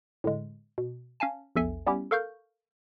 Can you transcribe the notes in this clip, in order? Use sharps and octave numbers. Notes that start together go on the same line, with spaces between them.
A2 D3 G#3
B2
C#4 F5 G#5 A5
A#1 E2 A4 E5 G#5
G3 B3 C#4 E4 G4
A4 A#4 F5 C#6 F6 G6